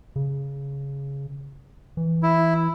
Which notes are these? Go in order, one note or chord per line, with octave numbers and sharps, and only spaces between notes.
C#3
E3
E4